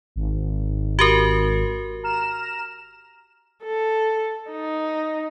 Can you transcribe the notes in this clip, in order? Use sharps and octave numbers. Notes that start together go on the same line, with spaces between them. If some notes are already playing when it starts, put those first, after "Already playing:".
G#1
F#4 G4 A#4
A#5 F6 E7
A4
D#4